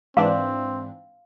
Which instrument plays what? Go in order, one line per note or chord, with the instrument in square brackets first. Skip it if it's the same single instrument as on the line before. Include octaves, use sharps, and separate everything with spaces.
[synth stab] G#2 E3 D4 [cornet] C4 [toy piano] F5